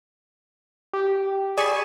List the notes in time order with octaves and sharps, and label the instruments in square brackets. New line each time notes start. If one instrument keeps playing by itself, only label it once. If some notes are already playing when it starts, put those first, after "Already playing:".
[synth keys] G4
[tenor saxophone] G#4 [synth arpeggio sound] D5 B5 [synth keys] C#6 E7